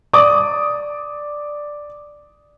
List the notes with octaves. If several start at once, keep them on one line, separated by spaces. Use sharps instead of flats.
D5 D6 D#6